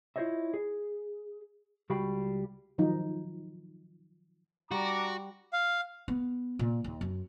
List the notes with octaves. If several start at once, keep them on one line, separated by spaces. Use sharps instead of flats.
E4 F4 C5 C#5 D#5 E5
G#4
C#2 G3 F#4 F5 G5 B5
D#3 F3 F#3 D#4
G3 D4 F#4 A#5 D6
F5
B3
A#2
D#2
F#2